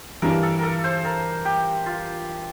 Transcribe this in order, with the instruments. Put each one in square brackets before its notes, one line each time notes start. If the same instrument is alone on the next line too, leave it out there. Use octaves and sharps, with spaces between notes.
[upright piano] G2 E3 G3 D4 [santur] A#4
[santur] A4
A4 A#4
C5
A#4
G4
F4